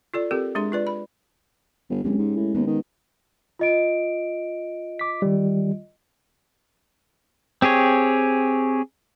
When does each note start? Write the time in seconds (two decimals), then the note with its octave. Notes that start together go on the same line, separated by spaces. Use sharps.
0.14 F4 A4 D5
0.31 C4 G4 A4 A#4
0.55 G#3 D4 G#4 C6
0.72 F4 B4 D5
0.87 B5
1.90 G1
2.04 D1 G#3 C#4 G4
2.18 G#2
2.36 A2
2.55 D#2 B3
2.66 D#3
3.59 F4 D#5 D7
4.99 D6 B6
5.22 D#3 G3
7.62 C4 G4 G#4 C#5